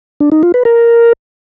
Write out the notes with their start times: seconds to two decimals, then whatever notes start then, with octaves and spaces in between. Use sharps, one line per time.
0.20 D4
0.32 D#4
0.43 F4
0.54 B4
0.65 A#4